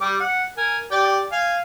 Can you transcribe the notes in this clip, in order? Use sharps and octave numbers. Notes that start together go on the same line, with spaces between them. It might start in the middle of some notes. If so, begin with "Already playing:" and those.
G3 G4 D6
F#5
A#4 G#5
G4 D5 G5
F5 G#5